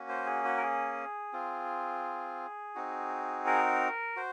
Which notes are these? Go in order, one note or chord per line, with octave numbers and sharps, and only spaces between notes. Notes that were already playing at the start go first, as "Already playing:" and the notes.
Already playing: A#3 C#4 F#4
C5
G#4
F#4
A#4
G#4
C4 F4
C4 D#4 F#4
A#4
F#4 C5